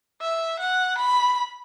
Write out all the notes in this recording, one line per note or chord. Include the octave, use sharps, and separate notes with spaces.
E5
F#5
B5